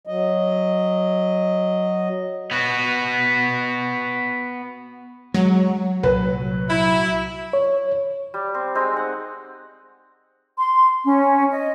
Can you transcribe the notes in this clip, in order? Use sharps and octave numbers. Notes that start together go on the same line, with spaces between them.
F#3 D#5
B3 F#4
F#3 G#3
C2 A#2 B4
E4
C#5
G3
C4
G#3 C4 D#4
F#5
C6
C#4
D#5